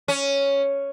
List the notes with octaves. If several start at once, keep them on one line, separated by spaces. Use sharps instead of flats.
C#4